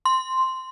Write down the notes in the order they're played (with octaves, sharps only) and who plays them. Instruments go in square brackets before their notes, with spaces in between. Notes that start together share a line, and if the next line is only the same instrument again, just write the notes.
[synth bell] C6